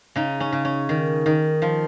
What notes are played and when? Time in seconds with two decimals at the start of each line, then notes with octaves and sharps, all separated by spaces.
0.16 C#3 D#4
0.40 C#4
0.53 C#3
0.65 C#4
0.89 D#3
1.26 D#3
1.62 F3 F4